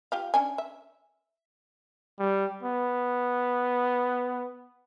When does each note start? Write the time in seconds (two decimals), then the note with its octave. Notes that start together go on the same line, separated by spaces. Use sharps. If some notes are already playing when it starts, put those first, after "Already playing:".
0.12 F4 G4 F5
0.34 C#4 D4 G#5
0.58 E5
2.19 G3
2.63 B3